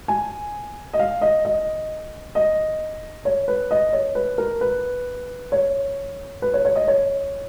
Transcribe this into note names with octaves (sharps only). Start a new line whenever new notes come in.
G#5
D#5
F5
D#5
D#5
D#5
C#5
B4
D#5
C#5
B4
A#4
B4
C#5
B4
C#5
C#5
D#5
C#5